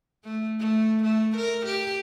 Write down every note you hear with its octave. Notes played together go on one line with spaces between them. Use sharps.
A3
A3
A3
A#4
G4